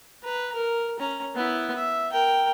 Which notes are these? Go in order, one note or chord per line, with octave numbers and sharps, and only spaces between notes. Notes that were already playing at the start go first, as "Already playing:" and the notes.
B4 A#5
A#4
C#4 A#5
B3 E4
E5
A#4 G5